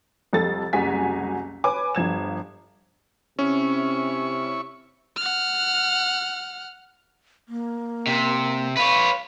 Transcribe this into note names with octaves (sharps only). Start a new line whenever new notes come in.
C2 F2 A4 A6
F#1 C2 F#4 G#5 B6
B4 C#5 G#5 D6
G1 F3 G#6 E7
C3 C#4 E4 C#5 C#6
F#5 F6
A#3
C3
B4 C#5 F5